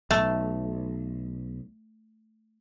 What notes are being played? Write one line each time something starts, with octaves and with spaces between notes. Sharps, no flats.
B1 A3